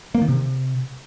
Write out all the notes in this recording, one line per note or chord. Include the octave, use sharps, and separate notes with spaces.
A#3
D#3
C3